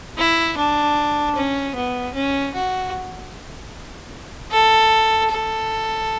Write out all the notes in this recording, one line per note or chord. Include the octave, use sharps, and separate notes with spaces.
E4
D4
C#4
B3
C#4
F#4
A4
A4